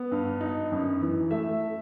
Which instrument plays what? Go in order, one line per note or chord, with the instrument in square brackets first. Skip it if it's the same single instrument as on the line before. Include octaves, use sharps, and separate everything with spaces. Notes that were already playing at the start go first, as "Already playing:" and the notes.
Already playing: [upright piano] B3
G2
D#4
F#2
E3
A3 E5